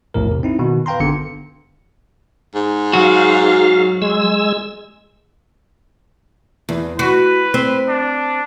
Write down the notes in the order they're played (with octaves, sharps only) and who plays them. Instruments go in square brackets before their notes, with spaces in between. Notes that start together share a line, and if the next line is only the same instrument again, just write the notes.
[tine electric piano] A#1 E2 A2 A#4
C3
C4 D#4 E4
B2 D#3
B4 F5 G5 A#5 C6
G1 D3 B3 C#7
[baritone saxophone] G#2
[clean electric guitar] F#3 F#4 [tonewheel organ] F5
[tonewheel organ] G#3 E6
[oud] E2
[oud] F#4 [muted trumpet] B4
[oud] C4
[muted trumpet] D4